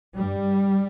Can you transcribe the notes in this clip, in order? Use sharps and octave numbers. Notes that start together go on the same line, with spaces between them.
G2 G3